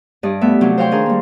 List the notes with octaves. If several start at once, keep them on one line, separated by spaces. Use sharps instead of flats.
G2 D5 D#5
A3 B3 E5
C3 F3 F#3 C4
C5 C#5 F5 G5 C6
D#3 D4 G#4 A#4
G3 A#3